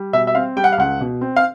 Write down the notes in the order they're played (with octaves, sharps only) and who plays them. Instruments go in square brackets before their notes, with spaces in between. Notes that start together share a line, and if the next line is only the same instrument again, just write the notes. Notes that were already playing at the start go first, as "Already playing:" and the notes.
Already playing: [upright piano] G3
B2 E5
E5
C4 F5
G3 G5
F#5
F5
C#2 F#5
B2
C4
F5